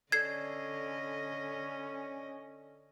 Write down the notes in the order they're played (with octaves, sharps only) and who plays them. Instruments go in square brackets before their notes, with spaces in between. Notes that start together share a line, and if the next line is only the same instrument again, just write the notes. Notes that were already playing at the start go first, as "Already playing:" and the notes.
[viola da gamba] D3 D#5 [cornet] C#4 [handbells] A4 D5 [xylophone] G#6 C7